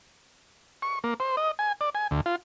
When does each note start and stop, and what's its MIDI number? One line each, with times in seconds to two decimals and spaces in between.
0.82 0.99 85
1.04 1.14 58
1.20 1.36 72
1.37 1.51 75
1.59 1.72 80
1.81 1.90 74
1.95 2.07 80
2.11 2.21 38
2.26 2.36 65